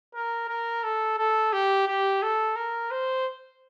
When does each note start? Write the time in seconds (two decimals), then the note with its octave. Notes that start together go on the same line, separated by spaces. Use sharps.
0.14 A#4
0.48 A#4
0.83 A4
1.18 A4
1.53 G4
1.87 G4
2.22 A4
2.56 A#4
2.91 C5